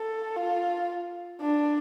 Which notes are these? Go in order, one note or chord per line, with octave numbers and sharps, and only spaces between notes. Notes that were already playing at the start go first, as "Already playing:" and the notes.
Already playing: A4
F4
D4